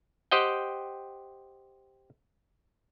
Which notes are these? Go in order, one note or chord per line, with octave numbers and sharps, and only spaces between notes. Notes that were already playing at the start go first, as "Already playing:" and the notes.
G4 C5 D#5 F#5 G5